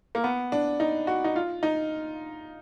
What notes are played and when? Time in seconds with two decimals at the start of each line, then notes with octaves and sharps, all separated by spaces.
0.15 A#3
0.24 B3
0.52 D4
0.80 D#4
1.07 F#4
1.24 D#4
1.36 F4
1.63 D#4